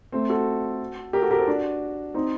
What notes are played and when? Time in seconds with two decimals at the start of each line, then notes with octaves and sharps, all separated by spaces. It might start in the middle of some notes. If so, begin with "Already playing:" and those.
0.12 A3 C4
0.29 F#4 A4
1.13 G4 A#4
1.22 F#4 A4
1.31 G4 A#4
1.38 A4 C5
1.48 D4 F#4
2.14 C4 D#4